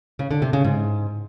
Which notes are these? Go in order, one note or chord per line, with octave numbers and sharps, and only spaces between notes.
C#3
D3
C3
C#3
G#2